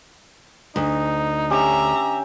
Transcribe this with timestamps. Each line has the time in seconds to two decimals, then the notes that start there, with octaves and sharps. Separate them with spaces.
0.76 D2 D#4
1.50 C#4 G4 C#5 E5 A#5